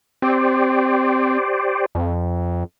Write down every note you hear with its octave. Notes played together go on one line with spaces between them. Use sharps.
C4 G4 C5 D5
F2